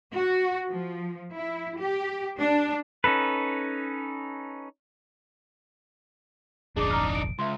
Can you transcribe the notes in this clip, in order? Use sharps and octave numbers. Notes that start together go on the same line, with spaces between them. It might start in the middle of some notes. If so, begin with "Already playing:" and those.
F#4
F3
E4
G4
D4
C#4 D#4 A4 B4
F1 A#1 D4 D#4 G#4 D6
A#5 D6 F6
D7
C#2 E5 C6